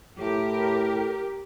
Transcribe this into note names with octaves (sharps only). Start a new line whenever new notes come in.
A2 G4 A#4